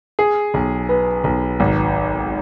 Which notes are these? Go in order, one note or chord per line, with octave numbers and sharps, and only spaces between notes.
G#4
B1
B3
B1
G#1